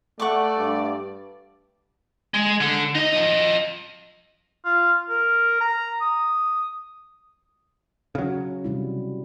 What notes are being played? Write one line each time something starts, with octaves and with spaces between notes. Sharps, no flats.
A3 D5 F#5 C#6 D6
G2
G#3
D3
D#4 D#5
F3 D#5
F4
A#4
A#5
D#6
C#3 F#3
C3 G3 E4